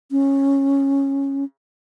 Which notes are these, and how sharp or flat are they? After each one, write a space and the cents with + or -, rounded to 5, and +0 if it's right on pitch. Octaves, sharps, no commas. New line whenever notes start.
C#4 -10